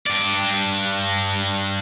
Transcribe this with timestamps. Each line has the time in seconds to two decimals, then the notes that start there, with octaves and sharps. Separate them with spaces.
0.06 G2 D5